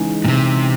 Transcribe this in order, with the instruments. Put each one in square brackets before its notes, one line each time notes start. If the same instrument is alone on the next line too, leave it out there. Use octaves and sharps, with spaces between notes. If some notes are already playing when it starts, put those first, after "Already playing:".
Already playing: [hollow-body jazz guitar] C#3 E3 G#3 D#4 G#4
[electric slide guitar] A2
C3